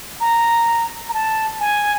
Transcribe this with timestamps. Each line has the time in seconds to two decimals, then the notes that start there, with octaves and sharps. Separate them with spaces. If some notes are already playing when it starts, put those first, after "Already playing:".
0.20 A#5
1.09 A#5
1.14 A5
1.60 G#5